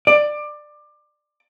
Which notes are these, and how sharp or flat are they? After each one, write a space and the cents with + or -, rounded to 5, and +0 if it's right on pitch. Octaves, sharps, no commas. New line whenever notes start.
D5 +20